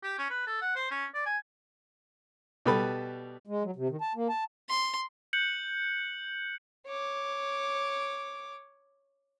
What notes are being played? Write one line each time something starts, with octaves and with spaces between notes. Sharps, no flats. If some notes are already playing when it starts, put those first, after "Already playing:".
G4
C#4
B4
A4
F#5
C5
C#4
D5
G#5
B2 G3 A4 B4 B5
G#3
F#3
C3
D#3
A5
A#3
A5
C6
F#6 G6 C#7 F#7
C#5 D6